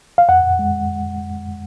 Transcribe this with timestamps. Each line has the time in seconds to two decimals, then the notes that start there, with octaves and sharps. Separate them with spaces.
0.18 F5
0.28 F2 F#5
0.59 G#3